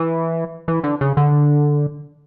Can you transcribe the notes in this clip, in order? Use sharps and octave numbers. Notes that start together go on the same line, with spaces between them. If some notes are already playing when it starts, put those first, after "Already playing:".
Already playing: E3
E3
D3
C#3
D3